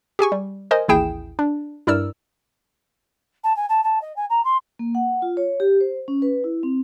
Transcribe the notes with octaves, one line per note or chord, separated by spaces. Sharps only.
G4 G#4 G#5 C#6
G3
A#4 C5 D#5 G#5
A1 D#2 E4 G#4 G5 E7
D4
G2 E4 A#4 D5 E6 F6
A5
G#5
A5
A5
D#5
G#5
A#5
C6
A#3
F#5
F4
C#5
G4
C5
C#4
B4
E4
C4